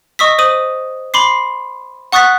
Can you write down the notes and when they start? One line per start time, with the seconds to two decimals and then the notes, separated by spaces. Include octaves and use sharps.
0.19 D#5 C#6 D#6 E6 B6
0.38 C5 D#6 D#7 F#7
1.14 B5 C6 D6 C7
2.12 F#5 C#6 D#6 F#6 A6 B6